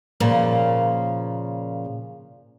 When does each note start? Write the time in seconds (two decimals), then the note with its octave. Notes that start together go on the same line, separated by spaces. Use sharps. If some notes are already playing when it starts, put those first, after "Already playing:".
0.20 A#2 C#3 F3 A#3